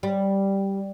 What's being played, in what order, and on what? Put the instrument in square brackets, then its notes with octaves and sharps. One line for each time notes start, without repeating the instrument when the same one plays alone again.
[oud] G3